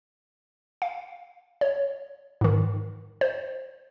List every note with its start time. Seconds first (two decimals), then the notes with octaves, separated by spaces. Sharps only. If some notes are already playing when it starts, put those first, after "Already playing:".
0.82 F5
1.61 C#5
2.41 G#2 D#3
3.21 C5